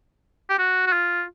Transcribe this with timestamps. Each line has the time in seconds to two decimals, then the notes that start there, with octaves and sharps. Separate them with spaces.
0.49 G4
0.59 F#4
0.87 F#4
0.93 F4